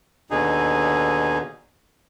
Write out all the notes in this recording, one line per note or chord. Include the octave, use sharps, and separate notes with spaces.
D#2 B2 D3 D#4 G#4